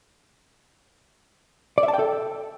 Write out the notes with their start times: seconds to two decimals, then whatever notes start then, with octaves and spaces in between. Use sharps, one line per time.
1.78 D5
1.83 E5
1.88 A5
1.94 G5
1.99 A4